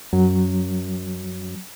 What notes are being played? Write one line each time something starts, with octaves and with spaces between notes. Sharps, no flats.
F#2 F#3